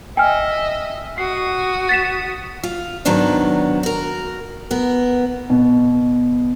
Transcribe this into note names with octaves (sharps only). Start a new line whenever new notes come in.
D#5 E5 G5 G#5 F6
F#4 D#6 C7
A6 B6 E7
F4
G#2 D#3 F#3 B3 D4 D#4
F#4 A#4
B3 A#4
B2